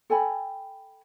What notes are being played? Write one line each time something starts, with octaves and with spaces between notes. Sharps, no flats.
A4 G5 G#5 B5